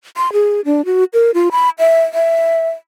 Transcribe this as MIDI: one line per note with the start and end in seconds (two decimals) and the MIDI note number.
0.17 0.32 84
0.33 0.61 68
0.65 0.85 62
0.85 1.04 66
1.13 1.31 70
1.34 1.49 65
1.52 1.70 83
1.79 2.02 76
2.14 2.69 76